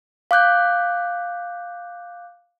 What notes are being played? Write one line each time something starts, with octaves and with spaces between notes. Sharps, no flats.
F5 D6 F#6 G6